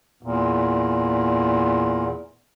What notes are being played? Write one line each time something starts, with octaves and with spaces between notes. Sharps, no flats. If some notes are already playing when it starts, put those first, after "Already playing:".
E2 A#2